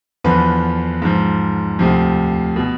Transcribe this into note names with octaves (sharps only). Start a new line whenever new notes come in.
E2 D3 F3 B4
G#2 F3
D2 C3 F3
B2